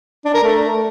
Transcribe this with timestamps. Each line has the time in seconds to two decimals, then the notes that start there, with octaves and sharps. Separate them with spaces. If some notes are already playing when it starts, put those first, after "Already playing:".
0.25 D4
0.34 A#4
0.44 A3